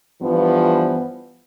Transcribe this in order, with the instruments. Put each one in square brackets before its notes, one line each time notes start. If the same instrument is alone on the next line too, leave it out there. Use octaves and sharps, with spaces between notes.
[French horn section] G2 E3 F3 B3